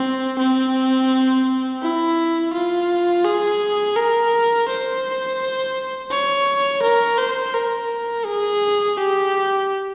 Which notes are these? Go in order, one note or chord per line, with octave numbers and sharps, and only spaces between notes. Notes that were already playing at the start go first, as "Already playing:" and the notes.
Already playing: C4
C4
E4
F4
G#4
A#4
C5
C#5
A#4
C5
A#4
G#4
G4